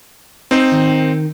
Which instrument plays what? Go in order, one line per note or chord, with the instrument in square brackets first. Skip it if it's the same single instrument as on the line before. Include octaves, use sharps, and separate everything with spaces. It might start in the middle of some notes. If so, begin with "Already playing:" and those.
[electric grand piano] C4 D#4 C5
[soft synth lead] D#3